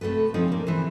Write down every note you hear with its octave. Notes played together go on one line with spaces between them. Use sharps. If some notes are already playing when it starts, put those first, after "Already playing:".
C3 A3 F#4 A4 B4
F3 C4 C#4 D#4
G3 A#3
E3 E4 C5